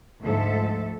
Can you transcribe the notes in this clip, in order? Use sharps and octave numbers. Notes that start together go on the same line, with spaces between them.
D2 G#2 F3 A3 A4 E5